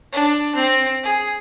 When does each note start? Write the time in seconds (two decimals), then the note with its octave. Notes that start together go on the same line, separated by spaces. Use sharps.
0.13 D4
0.55 C4
1.03 G#4